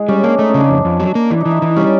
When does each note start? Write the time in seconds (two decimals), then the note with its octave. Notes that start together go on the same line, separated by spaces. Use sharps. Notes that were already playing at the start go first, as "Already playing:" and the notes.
Already playing: G#3
0.09 G3 C#4
0.23 A#3 D4
0.38 A3 D#4
0.48 C#4
0.54 C#3 D4
0.69 F2
0.85 F2
1.00 F#3
1.15 A#3
1.31 E3 D4
1.41 D#4
1.46 E3
1.51 E4
1.62 E3 D#4
1.76 G3 C#4